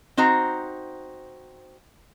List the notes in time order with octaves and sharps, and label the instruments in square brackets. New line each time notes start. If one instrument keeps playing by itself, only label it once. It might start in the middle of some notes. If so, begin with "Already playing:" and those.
[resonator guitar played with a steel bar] C4 D#4 F#4 C5 A#5